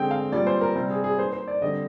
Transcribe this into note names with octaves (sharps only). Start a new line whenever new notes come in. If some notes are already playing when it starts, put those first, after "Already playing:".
Already playing: D3 G#3 C4 G5
F5
A#2 G3 C4 D5
C5
A#4
C3 G3 C4
G#4
G#4
D#3 A#3 C5
C5
D5
D3 G3 C4 D#5